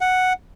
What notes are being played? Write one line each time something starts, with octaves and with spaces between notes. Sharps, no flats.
F#5